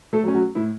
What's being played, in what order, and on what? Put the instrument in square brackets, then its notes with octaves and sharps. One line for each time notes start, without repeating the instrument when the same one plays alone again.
[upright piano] A3 A4
F#3
A3 C#4
F#3 F#4
A2 E4